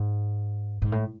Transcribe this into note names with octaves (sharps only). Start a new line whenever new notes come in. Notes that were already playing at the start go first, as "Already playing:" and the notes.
Already playing: G#2
G#2
A2